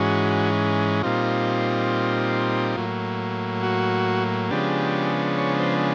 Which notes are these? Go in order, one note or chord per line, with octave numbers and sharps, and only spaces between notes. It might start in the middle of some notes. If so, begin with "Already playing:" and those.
Already playing: G#2 E3 G#3 C#4 F#4
A#2 G3 C4 D#4 F4
A2 F#3 A#3
F#4
C#3 F3 G#3 B3 D4 G4
C#5
C5